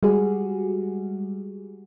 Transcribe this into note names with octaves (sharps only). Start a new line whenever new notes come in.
G3 G#3 F#4 G#4